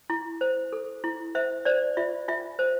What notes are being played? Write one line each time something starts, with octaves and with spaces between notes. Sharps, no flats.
E4
C5
A4
E4
C5 E5
C5 D5
F4 E5
F4 E5
C5